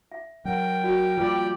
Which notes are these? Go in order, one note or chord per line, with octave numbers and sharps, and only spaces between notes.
E5
F#3 A#4 G5
F#4 D5
F3 G3 A#3 F4 G4 B4 D5